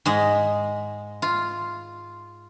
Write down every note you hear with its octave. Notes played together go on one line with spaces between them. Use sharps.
G#2 G#3 D#5
F4